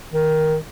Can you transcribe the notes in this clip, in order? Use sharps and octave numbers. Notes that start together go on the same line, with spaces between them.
D#3